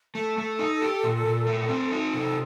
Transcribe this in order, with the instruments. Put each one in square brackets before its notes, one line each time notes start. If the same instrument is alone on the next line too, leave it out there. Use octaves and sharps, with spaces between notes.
[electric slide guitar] A3 [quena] A4
[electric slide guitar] A3
D#4
G4
A#2
A#2
A3
C4
D#4
[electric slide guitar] C3 [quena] A4